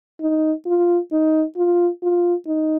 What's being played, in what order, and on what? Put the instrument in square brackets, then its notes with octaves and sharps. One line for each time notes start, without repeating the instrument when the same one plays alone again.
[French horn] D#4
F4
D#4
F4
F4
D#4